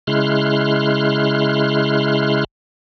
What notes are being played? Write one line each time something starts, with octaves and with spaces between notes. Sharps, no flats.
C#3 G#3 E4 C6 F6 F#6